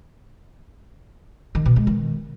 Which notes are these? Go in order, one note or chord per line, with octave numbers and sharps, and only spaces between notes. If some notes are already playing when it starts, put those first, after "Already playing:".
D#3
B2
G#3
D#3